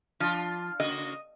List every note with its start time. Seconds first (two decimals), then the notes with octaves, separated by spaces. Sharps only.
0.20 F3 D4 F4
0.80 C#3 A#3 F#4 D#5